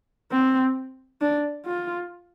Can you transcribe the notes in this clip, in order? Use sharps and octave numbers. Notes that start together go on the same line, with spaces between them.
C4
D4
F4